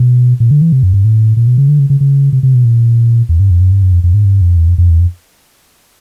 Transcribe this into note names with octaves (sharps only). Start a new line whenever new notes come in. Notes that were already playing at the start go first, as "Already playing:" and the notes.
Already playing: B2
A#2
D3
E3
C3
F#2
G2
A2
A#2
B2
C#3
D3
C#3
C#3
C#3
C3
C3
B2
A#2
E2
G2
F2
F#2
G2
F#2
F2
F2
G#2
G2
F2
E2
F2
F2
E2
F2